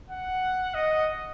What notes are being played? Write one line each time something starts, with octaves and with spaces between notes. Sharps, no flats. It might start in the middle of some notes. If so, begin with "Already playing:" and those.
F#5
D#5